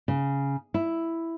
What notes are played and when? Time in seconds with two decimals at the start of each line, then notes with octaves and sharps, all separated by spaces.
0.08 C#3
0.74 E4